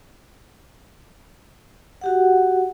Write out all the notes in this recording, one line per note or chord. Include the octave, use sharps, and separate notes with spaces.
F#4 G4 F#5